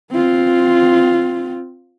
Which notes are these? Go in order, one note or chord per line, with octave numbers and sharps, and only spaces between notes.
C4 F4